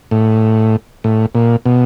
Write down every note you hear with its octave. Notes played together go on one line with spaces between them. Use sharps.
A2
A2
A#2
B2